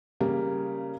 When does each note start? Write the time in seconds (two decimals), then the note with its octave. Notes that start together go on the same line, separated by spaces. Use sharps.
0.20 C#3 G3 A#3